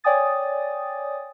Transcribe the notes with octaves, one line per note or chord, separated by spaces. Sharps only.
C#5 D5 G5 G#5 D#6 A6